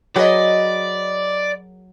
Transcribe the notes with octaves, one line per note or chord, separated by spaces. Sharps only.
F#3 G#4 A#4 B4 D5 D#5